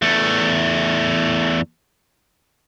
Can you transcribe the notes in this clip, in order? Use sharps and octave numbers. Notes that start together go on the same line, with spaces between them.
E2 A3